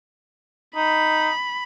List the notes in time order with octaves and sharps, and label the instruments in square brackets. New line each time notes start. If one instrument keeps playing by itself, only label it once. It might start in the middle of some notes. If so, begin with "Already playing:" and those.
[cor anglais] D#4 [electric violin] B5